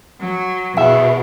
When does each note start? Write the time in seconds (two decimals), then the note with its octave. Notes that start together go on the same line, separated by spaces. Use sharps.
0.20 F#3
0.77 E2 B2 E5